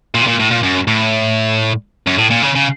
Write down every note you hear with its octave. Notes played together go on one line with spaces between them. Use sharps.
A#2
C3
A#2
A2
A#2
F#2
A2
F#2
A2
A#2
C#3
C#3